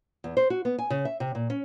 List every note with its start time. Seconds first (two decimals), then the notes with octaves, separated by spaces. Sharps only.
0.24 E2
0.37 C5
0.50 F#4
0.65 B3
0.78 G#5
0.90 C#3
1.05 E5
1.20 C3
1.35 A#2
1.50 C#4